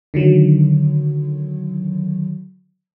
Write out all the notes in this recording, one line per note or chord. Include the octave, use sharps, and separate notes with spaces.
D3 D#3 F#3